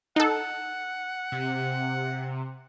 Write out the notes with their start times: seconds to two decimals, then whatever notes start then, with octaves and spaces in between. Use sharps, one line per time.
0.16 D#4 A4 F#5
1.32 C3